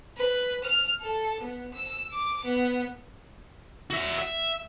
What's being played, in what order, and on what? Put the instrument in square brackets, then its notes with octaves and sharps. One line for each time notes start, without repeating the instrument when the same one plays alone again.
[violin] B4
F6
A4
B3
E6
D6
B3
[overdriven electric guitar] F#4 E5
E5